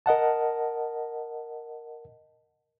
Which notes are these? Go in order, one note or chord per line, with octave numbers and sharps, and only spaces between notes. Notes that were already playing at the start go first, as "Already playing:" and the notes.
A#4 D#5 F#5 A5